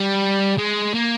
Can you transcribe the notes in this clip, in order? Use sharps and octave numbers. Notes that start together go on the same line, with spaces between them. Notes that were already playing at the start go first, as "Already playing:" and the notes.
Already playing: G3
G#3
A#3